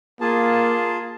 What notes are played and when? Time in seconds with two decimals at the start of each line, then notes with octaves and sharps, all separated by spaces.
0.21 A#3 F4 G#4 A5